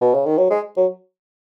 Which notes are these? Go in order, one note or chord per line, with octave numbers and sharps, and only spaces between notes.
B2
C#3
D#3
F#3
G#3
F#3